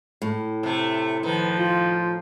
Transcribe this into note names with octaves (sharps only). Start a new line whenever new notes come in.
A2
C3 A3
D#3 F3 B4
F4